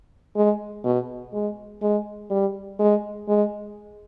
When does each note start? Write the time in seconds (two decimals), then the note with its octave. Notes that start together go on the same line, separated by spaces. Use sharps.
0.36 G#3
0.84 B2
1.33 G#3
1.82 G#3
2.30 G3
2.79 G#3
3.28 G#3